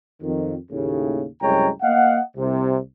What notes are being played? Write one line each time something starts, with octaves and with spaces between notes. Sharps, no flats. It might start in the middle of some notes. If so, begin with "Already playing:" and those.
F2 D#3
D#2 A2 C#3
C2 F#2 G#3 C#5 G5 A#5
A#3 D#5 F5 F#5
C2 C3